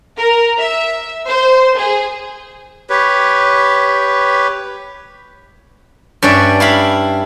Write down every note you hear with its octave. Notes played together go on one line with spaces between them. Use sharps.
A#4
E5
C5
G#4
G4 B4 C#5
G2 C#4 D4 D5 E5
E4 F5 B5